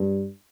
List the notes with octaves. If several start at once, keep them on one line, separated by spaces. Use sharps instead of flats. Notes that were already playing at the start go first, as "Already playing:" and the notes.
Already playing: G2